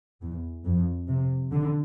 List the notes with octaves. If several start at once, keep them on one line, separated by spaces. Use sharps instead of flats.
E2
F2
C3
D3